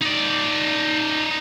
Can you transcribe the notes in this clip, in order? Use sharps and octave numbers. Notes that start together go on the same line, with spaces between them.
D#4 D5